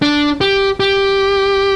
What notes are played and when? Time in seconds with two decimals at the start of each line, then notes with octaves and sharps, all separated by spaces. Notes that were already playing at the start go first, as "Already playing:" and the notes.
0.02 D4
0.41 G4
0.80 G4